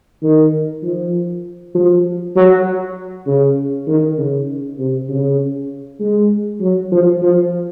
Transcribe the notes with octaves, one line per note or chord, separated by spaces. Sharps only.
D#3
F3
F3
F#3
C#3
D#3
C#3
C3
C#3
G#3
F#3
F3
F3